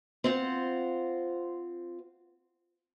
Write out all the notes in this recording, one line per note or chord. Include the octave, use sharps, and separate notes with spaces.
C4 F4 C5 F#5